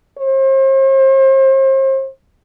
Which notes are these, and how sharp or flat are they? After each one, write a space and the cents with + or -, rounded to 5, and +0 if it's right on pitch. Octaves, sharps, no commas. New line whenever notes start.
C5 +40